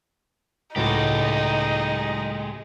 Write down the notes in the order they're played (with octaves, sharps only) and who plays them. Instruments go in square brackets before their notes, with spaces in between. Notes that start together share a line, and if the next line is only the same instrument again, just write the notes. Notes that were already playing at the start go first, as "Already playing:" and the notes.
[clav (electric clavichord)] C#2 A2 F#4 [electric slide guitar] G#3 G4 [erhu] D#4